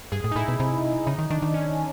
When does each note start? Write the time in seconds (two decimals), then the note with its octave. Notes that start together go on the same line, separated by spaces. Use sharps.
0.12 G2 G#4
0.24 A2
0.31 D#4
0.36 A2 E4
0.48 B2
0.60 C3
1.07 C#3 D#4
1.19 D#3
1.30 D#3 D4
1.42 D#3
1.54 C#4